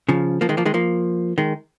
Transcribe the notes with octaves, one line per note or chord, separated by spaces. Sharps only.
C#3 F3
F3 A#3
D#3 G#3
F3 A#3
D#3 G#3
F3 A#3
D#3 G#3